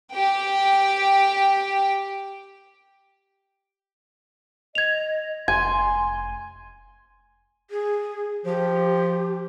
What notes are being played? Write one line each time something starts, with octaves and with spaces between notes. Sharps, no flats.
G4 G5
D#5 G#6 F7
F1 G#5 C6 G#6
G#4
F3 G4